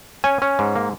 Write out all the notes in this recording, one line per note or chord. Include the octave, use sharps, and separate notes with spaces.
C#4 G#5
C#4
G#2
A#3